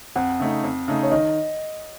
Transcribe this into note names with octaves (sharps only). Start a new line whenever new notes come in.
F2 F#5
C#3 A3 D#4
F2
C#3 A3 D#4
C#5
D#3 D#5